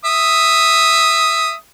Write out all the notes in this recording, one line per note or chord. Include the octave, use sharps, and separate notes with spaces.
E5 D#6